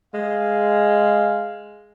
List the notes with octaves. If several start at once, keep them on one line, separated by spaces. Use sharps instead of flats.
G#3 F5